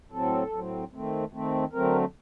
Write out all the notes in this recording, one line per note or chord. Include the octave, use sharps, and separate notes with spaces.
A2 F#3 C4 A4
A2 F#3 C4
D#3 A3 C4
D#3 A3 C4
D3 F#3 A3 C4 A#4